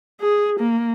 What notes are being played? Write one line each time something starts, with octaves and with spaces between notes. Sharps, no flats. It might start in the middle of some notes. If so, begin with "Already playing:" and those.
G#4
A#3